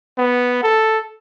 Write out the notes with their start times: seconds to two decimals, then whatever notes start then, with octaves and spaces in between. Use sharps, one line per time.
0.18 B3
0.63 A4